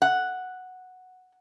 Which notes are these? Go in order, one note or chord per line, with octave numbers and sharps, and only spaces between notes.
F#5